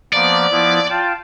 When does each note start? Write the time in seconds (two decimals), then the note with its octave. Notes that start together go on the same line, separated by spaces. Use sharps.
0.13 F3 A#3 B3 D5
0.51 F3 B3 E4
0.89 F4 G5 A5